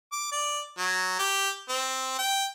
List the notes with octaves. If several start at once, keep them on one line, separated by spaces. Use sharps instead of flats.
D6
D5
F#3
G4
C4
G5